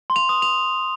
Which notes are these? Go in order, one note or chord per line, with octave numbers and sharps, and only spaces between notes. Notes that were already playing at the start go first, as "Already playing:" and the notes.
C6
F7
D#6
F7